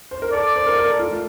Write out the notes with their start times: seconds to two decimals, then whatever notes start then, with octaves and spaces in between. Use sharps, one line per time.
0.11 C5
0.22 A#4
0.33 A4 D5
0.56 C5
0.66 A#4
0.78 A#4
0.89 A4
0.99 F4
1.11 A3